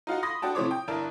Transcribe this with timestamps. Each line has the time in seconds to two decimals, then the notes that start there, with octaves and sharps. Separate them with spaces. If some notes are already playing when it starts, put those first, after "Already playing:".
0.07 D#4 F4 F#4 F5
0.23 B5 C6 D#6 A#6
0.42 D4 F#4 G5 A5
0.55 A2 C3 F3 C5 C#5 D6
0.71 G5
0.88 G1 D4 E4 A#4 A5